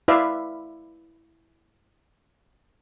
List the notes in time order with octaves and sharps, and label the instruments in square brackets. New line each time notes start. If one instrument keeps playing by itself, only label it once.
[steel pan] E4 B4 D5 E5 F5